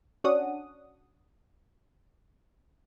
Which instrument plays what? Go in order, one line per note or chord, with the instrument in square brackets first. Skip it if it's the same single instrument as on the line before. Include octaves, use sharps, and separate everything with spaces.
[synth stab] C#4 D4 F#4 F#5 D#6